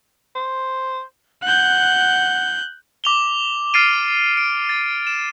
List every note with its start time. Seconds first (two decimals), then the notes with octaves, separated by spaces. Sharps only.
0.35 C5
1.43 F#5 F#6 G6
3.04 D6 F7 G7
3.74 F6 A6 C7 D7 D#7
4.37 D7
4.69 A6
5.07 E7